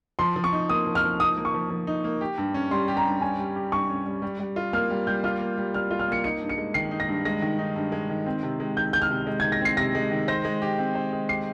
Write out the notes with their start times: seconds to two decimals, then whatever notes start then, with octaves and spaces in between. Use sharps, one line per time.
0.19 F3 C6
0.36 F3
0.44 C#6
0.53 D#4
0.69 A#3 D#6
0.86 F3
0.95 F6
1.03 F3
1.20 D#4 D#6
1.37 A#3
1.45 C#6
1.54 F3
1.70 F3
1.87 D#4
2.04 A#3
2.21 G4
2.38 G2
2.54 C#4
2.71 G3 C6
2.88 G4
2.97 A#5
3.05 G2
3.21 C#4 G#5
3.39 G3
3.56 G4
3.72 G2 C#6
3.89 C#4
4.06 G3
4.22 G3
4.39 G3
4.56 F4
4.73 A#3 F6
4.90 G3
5.07 G3 G6
5.24 F4 F6
5.40 A#3
5.58 G3
5.74 G3 F6
5.91 F4
5.99 F6
6.08 A#3 C#7
6.24 D#4 C#7
6.42 G2
6.49 C#7
6.58 G#3
6.74 D#3 C7
6.91 D#4
7.00 A#6
7.09 G2
7.25 G#3 A#6
7.42 D#3
7.59 D#4
7.76 G2
7.92 G#3
8.10 D#3
8.26 C4
8.43 C3
8.60 G#3
8.76 D#3 G6
8.93 C4 G6
9.02 F6
9.11 C3
9.27 G#3
9.40 G#6
9.44 D#3
9.52 A#6
9.61 C4 C7
9.77 C3 A#6
9.95 G#3
10.11 D#3
10.28 C5 A#6
10.45 G#3
10.62 G4
10.78 C4
10.95 C5
11.13 G#3
11.29 G4 C7